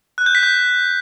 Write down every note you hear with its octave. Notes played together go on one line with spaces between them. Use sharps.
F#6
G6
B6
G6